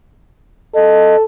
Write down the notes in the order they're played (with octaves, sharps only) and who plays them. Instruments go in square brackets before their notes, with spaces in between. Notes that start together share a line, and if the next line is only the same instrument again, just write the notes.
[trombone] A4 [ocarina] D#5